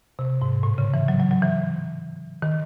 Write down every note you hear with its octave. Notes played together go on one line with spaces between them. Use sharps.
C3
G#2
A2
C#3
E3
F#3
F#3
F#3
E3
D#3